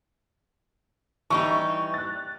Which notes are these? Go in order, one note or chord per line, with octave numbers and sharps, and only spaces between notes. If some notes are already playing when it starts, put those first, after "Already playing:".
E3 G3 D#4 C#6
F#6 A6